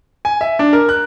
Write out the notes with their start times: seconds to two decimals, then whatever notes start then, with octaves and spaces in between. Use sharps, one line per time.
0.25 G#5
0.41 E5
0.59 D4
0.73 A#4
0.89 F#6